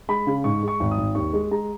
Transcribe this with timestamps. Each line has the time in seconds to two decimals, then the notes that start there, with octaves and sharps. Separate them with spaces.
0.09 G#3 B5
0.27 C#3
0.44 G#2 C#6
0.63 G#3 C#6
0.80 G#1
0.91 D#6
0.98 G#1
1.15 D#2 C#6
1.33 G#3
1.51 G#3 A#5